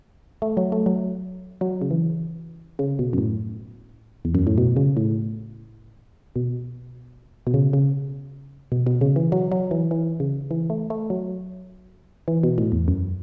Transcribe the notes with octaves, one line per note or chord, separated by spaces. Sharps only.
A3
F#3
A3
F#3
F#3
C#3
E3
C#3
B2
F#2
A2
E2
F#2
A2
B2
C#3
A2
B2
B2
C#3
C#3
B2
B2
C#3
E3
F#3
F#3
E3
E3
C#3
E3
A3
A3
F#3
E3
B2
A2
E2
F#2